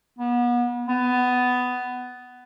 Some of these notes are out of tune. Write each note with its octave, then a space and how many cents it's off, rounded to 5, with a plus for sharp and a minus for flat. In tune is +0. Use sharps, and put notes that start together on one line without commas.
B3 -35
B3 +15